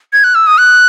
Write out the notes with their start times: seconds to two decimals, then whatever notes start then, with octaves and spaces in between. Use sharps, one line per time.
0.13 G#6
0.24 F#6
0.35 E6
0.47 D#6
0.58 F#6